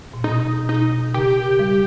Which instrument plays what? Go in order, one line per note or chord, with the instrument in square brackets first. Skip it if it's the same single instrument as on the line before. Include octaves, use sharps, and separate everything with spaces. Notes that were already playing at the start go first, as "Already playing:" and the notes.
[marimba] A#2
[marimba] B2 [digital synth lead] D#4
[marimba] B2 [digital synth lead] D#4
[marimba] C#3 [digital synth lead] G4
[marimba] G3